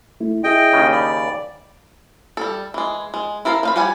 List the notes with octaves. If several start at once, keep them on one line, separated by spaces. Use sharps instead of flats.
A3 E4
E4 G#4 D#5 E5 G5
D#2 C#3
D5 F5 B5
G3 A4
E3 G#3
G#3
E4 A4 A#4 C#5 F5
F3 F5 B5
G3 D5 F#5 G#5 B5